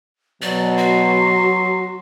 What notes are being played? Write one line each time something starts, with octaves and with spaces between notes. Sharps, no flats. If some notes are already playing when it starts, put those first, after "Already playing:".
B2 F#3 D5
F#4 C6